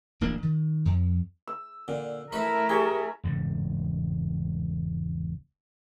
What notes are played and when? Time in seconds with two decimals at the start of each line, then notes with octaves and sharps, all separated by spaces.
0.21 D1 A1 A#3 D4
0.43 D#3
0.85 F2
1.47 E6
1.88 A#2 D3
2.32 A3 E4 A#4 B4 C#5 E5 B5
2.69 G4 G#4 C#5
3.24 E1 C#2 G#2